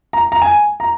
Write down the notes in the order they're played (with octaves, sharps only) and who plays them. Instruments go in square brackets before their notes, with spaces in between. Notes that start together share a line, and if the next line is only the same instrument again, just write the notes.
[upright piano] A#5
A#5
G#5
A#5